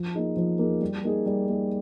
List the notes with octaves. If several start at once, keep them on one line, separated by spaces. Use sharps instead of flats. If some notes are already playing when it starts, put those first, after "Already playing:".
Already playing: F3
A#3 D#4 G#4
F3
A#3 D#4 G#4
G3
A#3 D#4 G#4
G3
A#3 D#4 G#4